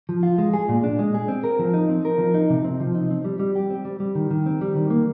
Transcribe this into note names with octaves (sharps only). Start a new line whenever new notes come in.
F3
F4
G#3
G#4
A#2
D4
G#3
G#4
C4
A#4
F3
D#4
C4
A#4
F3
D#4
C3
C4
F3
D#4
C4
G3
G3
G4
C4
G3
G3
D#3
D#3
C4
G3
D#3
A#3